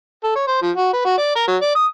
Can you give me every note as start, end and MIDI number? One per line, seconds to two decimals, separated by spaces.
0.24 0.31 69
0.35 0.47 73
0.47 0.58 72
0.62 0.70 53
0.76 0.92 66
0.93 1.02 71
1.05 1.18 66
1.18 1.35 74
1.36 1.43 70
1.47 1.56 54
1.62 1.71 74
1.75 1.85 87